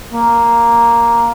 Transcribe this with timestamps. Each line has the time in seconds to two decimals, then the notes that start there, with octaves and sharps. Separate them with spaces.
0.13 A#3